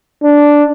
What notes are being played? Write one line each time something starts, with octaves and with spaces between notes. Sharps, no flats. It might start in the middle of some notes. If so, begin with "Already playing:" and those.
D4